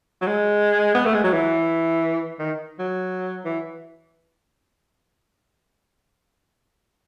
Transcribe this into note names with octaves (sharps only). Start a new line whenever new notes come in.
F#3
G#3
B3
A3
G#3
F#3
E3
D#3
F#3
E3